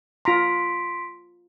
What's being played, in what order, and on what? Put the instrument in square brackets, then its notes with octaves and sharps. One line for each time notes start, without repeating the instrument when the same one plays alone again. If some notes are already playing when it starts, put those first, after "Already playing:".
[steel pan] F4 A#5 [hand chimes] C6 B6 D7